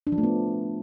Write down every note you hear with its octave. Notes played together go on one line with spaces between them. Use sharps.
D4
F3
A3
B3